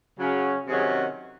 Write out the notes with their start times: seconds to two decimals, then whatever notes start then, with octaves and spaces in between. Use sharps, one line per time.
0.19 C#3 F#3 C#4
0.68 C3 D#3 F#3 C#4 G#4